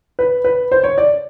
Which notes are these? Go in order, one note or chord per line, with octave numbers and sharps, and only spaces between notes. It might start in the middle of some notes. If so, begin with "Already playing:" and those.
B4
B4
C5
C#5
D5